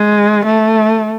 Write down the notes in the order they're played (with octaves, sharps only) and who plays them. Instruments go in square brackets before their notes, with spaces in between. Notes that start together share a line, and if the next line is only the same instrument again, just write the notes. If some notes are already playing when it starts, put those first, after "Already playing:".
Already playing: [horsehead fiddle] G#3
A3